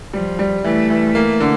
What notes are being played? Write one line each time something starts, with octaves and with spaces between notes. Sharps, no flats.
F3 G3
G3
E3 A3
E3
A#3
D3